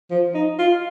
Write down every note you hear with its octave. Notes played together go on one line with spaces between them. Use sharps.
F3
D#4
F4